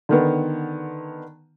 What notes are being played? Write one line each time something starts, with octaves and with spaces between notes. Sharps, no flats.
D3 D#3 B3